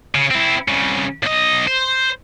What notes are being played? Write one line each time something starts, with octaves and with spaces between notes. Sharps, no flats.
C#3
C4 E4
C2 C#3
B1 D#5
C5